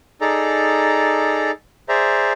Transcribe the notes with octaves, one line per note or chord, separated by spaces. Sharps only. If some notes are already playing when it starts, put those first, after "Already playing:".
D#4 G#4 A4 D5 A#5
G#4 C5 D5 E5 A#5